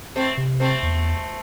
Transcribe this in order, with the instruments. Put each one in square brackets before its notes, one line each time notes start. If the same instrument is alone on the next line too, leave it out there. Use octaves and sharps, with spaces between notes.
[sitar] A3 C4
[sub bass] C3
[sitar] A3 C4
[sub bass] E2